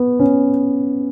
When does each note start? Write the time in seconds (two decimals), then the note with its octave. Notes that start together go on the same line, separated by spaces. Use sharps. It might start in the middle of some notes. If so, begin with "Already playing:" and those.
Already playing: B3
0.20 C#4